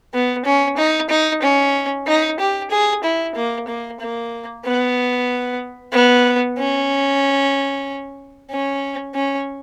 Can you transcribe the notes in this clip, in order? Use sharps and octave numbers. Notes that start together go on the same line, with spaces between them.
B3
C#4
D#4
D#4
C#4
D#4
G4
G#4
E4
A#3
A#3
A#3
B3
B3
C#4
C#4
C#4